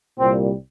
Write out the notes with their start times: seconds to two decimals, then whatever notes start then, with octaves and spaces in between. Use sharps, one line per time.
0.18 C2 A#2 G3 C4